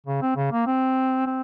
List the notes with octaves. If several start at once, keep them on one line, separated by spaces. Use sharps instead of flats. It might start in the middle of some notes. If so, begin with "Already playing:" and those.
C#3
C4
C#3
A#3
C4
C4